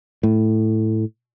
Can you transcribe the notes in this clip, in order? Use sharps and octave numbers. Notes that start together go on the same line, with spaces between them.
A2